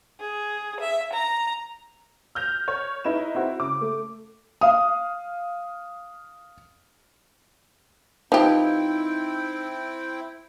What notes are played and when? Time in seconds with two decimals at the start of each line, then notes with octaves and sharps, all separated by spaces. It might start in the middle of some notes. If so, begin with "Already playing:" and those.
0.20 G#4
0.80 E5
1.13 A#5
2.35 F6 G6 A#6 F7
2.68 C#5
3.04 D#4 E4 B4 E7
3.35 C4 E4 F#4
3.60 C#3 D6
3.81 A3
4.61 F5 D#6
8.32 F3 C4 D#4 E4 G4 B4 G5